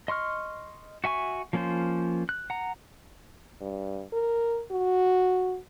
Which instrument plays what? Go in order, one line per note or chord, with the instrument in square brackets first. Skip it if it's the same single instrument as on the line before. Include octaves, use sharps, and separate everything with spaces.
[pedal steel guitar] D#5 C6 C#6 F6
F#4 E5 G#5 C#6
F3 A#3 C#4 F4 C5
F#6
F#5 A#5
[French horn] G2
A#4
F#4